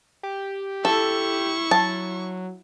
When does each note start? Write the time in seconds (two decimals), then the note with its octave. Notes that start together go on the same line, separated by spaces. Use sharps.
0.23 G4
0.85 E4 A4 C#6
1.71 F#3 A5